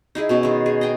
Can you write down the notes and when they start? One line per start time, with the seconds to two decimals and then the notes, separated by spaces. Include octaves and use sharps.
0.15 D#4 E4 G#4
0.29 B2 C#4 E4
0.43 D#3 G#3
0.66 G#4
0.81 D#5 G5 G#5